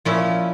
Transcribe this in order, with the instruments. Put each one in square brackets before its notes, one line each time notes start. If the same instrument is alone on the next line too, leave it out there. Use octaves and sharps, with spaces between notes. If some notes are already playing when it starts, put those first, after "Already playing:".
[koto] A#2 F3 C#4 E4